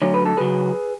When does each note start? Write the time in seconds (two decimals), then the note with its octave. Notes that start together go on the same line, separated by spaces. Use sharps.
0.02 D2 D3 F#3 C#5
0.14 B4
0.25 A4
0.37 C#3 F#3 G#4 B4